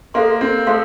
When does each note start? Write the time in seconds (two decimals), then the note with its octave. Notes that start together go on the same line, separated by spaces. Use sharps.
0.14 A#3 A4 C5 F5 C6
0.41 C4
0.67 A3 A4 C5 F5 C6